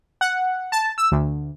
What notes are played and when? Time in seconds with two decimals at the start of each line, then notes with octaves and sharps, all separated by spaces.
0.21 F#5
0.72 A5
0.98 E6
1.12 D2